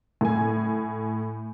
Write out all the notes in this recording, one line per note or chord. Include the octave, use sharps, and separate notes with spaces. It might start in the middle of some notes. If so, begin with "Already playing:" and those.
A2 G#5